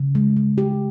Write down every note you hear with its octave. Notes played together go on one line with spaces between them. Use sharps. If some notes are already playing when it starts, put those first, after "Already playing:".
Already playing: C#3
G#3
G#3
G4